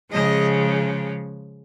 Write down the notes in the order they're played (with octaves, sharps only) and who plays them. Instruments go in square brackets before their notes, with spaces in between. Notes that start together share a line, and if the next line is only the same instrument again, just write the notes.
[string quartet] C#3 F3 G#3 D#5